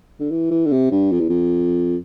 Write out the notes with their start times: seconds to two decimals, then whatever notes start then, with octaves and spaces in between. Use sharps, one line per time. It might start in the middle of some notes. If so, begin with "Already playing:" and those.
0.20 D3
0.30 E3
0.51 E3
0.66 D3
0.72 C3
0.91 G2
1.12 F2
1.20 E2
1.29 F2